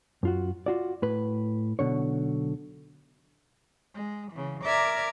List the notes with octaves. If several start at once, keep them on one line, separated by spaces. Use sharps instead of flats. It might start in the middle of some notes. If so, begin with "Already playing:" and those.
F#2 F4 F#4
F4 F#4 D5
A2 B4
B1 B2 D3 C#5
G#3
C#3 E3
A#4 D5 E5 D6 F6 G#6